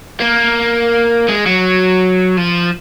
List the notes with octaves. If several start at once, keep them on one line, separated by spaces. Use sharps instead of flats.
A#3
G#3
F#3
F3